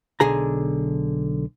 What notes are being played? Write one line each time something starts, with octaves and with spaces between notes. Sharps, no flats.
B1 D3 G#4 A#5